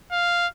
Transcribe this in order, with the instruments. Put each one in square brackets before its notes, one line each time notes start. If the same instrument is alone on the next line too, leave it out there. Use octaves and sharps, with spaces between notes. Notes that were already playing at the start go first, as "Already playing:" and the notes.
[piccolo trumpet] F5